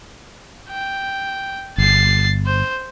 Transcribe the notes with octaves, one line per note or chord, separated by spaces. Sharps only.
G5
G1 A6 C7
C5